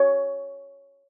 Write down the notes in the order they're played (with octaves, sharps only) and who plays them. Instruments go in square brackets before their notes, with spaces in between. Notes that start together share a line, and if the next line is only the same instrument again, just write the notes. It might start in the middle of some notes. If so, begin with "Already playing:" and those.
Already playing: [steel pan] C#5